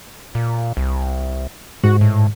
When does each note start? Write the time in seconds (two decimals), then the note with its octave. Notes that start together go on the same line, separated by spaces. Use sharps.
0.35 A#2
0.77 C2
1.84 G#2 F#4
2.01 A2